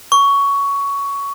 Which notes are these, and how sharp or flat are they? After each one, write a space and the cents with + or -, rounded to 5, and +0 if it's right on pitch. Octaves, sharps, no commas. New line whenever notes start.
C#6 +15